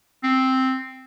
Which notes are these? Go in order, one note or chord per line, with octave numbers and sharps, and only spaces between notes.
C4